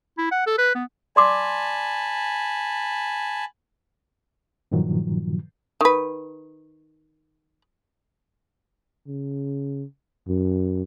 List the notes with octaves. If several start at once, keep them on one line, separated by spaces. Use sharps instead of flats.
E4
F#5
A4
B4
B3
D5 G#5 A5 B5 C6 D6
G2 A#2 D#3 F3 F#3
D#3 B4
C#3
F#2